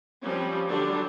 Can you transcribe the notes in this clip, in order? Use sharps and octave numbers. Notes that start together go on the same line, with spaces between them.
F3 G3 C4 C#4
D3 F#3 G3 D4